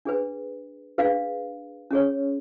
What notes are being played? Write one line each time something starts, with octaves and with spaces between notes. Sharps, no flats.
D4 G#4 B4
D4 G#4 B4 F5
C#4 G#4 C#5